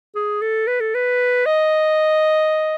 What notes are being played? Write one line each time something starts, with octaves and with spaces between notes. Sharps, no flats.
G#4
A4
B4
A4
B4
D#5